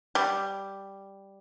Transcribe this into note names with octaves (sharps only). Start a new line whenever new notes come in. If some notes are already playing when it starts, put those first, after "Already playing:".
G3